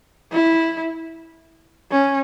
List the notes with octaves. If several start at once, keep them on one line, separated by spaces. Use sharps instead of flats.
E4
C#4